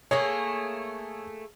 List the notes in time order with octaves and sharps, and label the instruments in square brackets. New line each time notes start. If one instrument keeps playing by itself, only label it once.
[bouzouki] A3 A#3 G#4 [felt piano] C#5